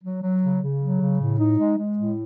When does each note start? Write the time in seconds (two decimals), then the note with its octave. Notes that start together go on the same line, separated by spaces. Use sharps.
0.03 F#3
0.23 F#3
0.43 C#3
0.62 C#3
0.81 F#3
1.00 C#3
1.20 A2
1.38 D#4
1.58 G#3
1.78 G#3
1.97 A2